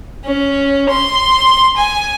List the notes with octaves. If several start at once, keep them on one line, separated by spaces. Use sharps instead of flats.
C#4
C6
G#5